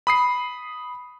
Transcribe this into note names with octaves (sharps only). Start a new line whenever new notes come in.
B5 D#6 C7